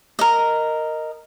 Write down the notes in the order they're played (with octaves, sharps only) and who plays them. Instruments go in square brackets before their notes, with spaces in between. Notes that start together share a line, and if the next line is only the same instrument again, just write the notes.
[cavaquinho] A#4 D#5